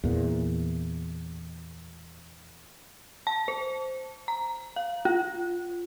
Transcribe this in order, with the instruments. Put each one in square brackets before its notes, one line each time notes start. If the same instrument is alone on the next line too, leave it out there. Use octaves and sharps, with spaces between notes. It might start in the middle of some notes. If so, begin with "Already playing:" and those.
[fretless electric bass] E2 A#2
[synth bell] A5
C5
A#5
F5
F4